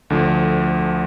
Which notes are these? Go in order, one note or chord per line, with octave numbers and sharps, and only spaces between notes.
D2 D3 F3